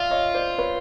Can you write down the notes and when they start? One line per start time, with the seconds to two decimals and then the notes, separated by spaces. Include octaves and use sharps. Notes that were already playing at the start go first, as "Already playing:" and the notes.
Already playing: F4 D5 E5 F5
0.11 C#5 D#5
0.34 C5 D5
0.59 B4 C#5